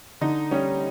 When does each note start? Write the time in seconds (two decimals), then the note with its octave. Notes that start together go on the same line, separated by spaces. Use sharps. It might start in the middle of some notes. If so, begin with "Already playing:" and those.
0.21 D3 D#4
0.51 G3 C#4